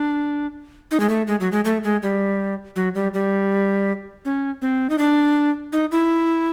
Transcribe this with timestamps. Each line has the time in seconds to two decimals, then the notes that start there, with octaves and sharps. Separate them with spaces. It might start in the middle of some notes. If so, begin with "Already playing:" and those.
Already playing: D4
0.91 D#4
1.00 G#3
1.09 A3
1.27 G#3
1.40 F#3
1.52 G#3
1.65 A3
1.84 G#3
2.02 G3
2.76 F#3
2.95 G3
3.14 G3
4.25 C#4
4.62 C4
4.90 D#4
4.98 D4
5.72 D#4
5.91 E4